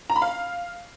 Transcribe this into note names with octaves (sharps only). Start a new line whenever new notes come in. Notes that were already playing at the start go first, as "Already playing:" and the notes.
A#5
B5
F5